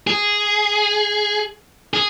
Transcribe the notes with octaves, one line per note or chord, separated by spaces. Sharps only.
G#4
G#4